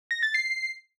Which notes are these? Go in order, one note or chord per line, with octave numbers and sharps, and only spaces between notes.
A#6
A6
C7